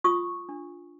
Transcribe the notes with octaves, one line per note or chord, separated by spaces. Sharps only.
F4 C#6 D#6
D4